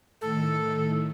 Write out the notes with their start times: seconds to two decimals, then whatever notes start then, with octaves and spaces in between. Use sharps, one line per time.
0.21 A2 D#3 A4